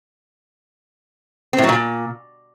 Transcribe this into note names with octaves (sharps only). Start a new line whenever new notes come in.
C4
A2
F#3
A#2